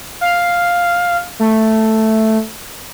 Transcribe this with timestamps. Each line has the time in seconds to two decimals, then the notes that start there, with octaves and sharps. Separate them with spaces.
0.21 F5
1.39 A3